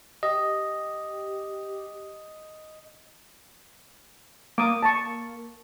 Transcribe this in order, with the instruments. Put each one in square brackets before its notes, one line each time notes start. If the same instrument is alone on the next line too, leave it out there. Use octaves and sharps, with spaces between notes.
[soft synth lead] G4 [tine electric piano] D#5
[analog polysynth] A#3 [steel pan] D6 D#6
[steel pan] A5 C#6